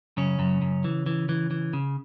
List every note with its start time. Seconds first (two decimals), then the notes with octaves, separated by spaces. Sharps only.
0.17 F#2 C#3 C#4
0.39 F#2
0.62 F#2
0.84 E3
1.06 E3
1.29 E3
1.51 E3
1.73 C#3